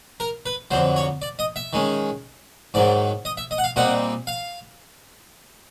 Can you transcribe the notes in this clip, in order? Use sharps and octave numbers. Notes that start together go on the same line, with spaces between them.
A#4
B4
F2 D3 F#3 C5
C#5
D5
D#5
E5
D#3 G#3 C#4
G#2 D#3 F#3 D5
D#5
E5
D#5
F#5
F5
A#2 G3 C4 D#4 F#5
F5